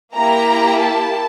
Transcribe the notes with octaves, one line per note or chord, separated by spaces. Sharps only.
A#3 E4 G4 A#5
A5